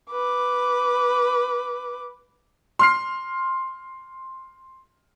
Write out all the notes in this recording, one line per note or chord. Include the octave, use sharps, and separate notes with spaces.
B4 D6
C6 F6 C7